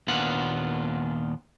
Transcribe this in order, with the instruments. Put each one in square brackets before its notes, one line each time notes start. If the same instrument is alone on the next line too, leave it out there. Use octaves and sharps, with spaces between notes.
[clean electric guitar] D#2 A#2 B3 D4 F4 F#5